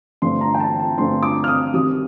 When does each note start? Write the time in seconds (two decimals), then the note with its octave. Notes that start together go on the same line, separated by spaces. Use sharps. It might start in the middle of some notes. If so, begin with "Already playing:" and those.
0.22 G2 D3 A3 C4 C6
0.41 A#5
0.55 G5
0.60 A5
0.80 A5
0.98 G2 D3 A3 C4 C6
1.23 D6
1.44 F6
1.48 D#6
1.74 C3 D#3 G3 D#6